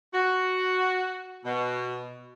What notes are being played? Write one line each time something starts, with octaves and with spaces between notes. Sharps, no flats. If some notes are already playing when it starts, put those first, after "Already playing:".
F#4
B2